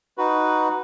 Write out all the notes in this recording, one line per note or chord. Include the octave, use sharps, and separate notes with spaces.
D#4 F#4 B4